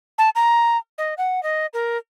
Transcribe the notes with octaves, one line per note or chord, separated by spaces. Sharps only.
A5
A#5
D#5
F#5
D#5
A#4